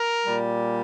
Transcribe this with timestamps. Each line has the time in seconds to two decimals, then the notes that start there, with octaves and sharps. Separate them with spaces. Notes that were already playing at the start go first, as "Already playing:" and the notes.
Already playing: A#4
0.26 A#2 G3